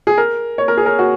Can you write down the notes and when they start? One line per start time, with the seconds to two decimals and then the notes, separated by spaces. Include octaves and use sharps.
0.07 G#4
0.18 A#4
0.58 C#5
0.68 A#4
0.77 G#4
0.86 A#4
0.99 F#4